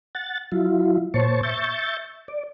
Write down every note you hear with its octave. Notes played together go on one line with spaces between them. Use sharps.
F#5 A6
F#3 E4 F4
A#2 C5 C#5 A5 C#6
E5 C#6 G6 A6
D5